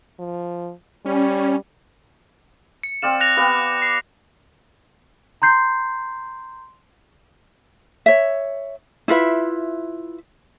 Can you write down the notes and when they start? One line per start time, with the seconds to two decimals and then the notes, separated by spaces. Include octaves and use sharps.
0.19 F3
1.06 G3 C#4
2.83 C#7
3.02 C4 D5 F5 E7
3.20 F#6 A#6 F7
3.37 B3 G4 F5
3.82 C7
5.42 A#5 C6 G6 C7
8.06 C#5 E5
9.08 E4 F4 B4 E5